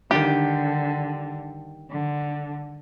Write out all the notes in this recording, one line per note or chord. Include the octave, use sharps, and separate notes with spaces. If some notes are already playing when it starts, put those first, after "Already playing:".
D3 D#3 G3 D4 G4
D3